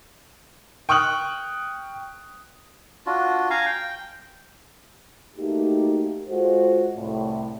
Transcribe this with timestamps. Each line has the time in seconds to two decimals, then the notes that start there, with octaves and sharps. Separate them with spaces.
0.89 G5 C#6 D#6 F6 F#6 F#7
3.06 D4 F4 F#4
3.50 F5 G#5 A#5
3.66 G5
5.37 A3 A#3 D#4 F#4 G4
6.28 G#3 F4 F#4 A4 C5
6.95 C2 A2